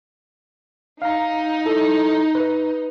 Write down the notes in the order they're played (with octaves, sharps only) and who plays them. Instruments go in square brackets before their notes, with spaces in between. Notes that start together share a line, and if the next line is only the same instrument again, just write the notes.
[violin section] D#4 [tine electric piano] F5 A#5
[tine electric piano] E4 A4
B4